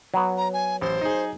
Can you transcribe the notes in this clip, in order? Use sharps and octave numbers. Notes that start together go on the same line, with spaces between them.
F#3 B3
A#5
G#5
A1 C5
D#4 G#4